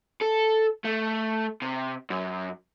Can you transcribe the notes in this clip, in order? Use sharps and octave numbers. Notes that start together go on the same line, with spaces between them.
A4
A3
C3
F#2